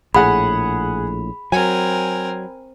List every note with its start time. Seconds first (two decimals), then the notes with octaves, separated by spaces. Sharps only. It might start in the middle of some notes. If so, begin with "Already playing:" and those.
0.15 A#1 A2 G#4 F#5 B5
1.52 F#3 C4 A#4 G#5